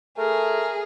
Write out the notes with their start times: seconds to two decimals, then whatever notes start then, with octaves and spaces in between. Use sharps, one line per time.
0.18 A3 G#4 A#4